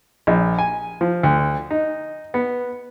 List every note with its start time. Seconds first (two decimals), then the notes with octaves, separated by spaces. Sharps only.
0.27 A#1
0.59 G#5
1.01 F3
1.23 D2
1.71 D#4
2.34 B3